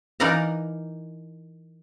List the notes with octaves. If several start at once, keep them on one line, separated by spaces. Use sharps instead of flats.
E3 D#4 A#4 D5 F5 A#5